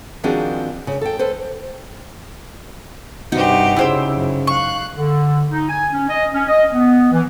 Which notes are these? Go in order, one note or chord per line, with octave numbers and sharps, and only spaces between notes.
D#3 F3 C4 D4 F#4 G#4
C#3
A4 G5
A4 B4 C5
G2 C3 D#4 F#4 G4
C#3 E4 C5 E6
F#2
F5 C#6 F#6
D3
D#4
G#5
C#4
D#5
C#4
D#5
B3
E3